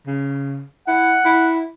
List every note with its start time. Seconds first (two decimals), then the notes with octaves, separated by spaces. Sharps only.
0.07 C#3
0.88 E4 F#5
1.25 E4